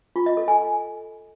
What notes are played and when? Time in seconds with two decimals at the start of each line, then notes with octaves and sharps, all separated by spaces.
0.16 F4
0.26 D#5
0.37 A4
0.48 G#5